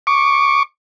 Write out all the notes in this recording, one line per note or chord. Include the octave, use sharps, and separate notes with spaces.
C#6 D6